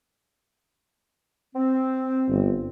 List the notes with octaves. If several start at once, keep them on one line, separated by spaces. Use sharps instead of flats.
C4
G1